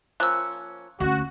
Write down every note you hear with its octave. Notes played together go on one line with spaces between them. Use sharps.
F3 A#3 C#4 E6 F#6
D2 C#4 F#4